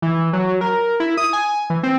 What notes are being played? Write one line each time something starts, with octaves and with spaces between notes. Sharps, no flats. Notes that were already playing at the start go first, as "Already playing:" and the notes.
E3
F#3
A#4
E4
D#6
G#5
E3
C4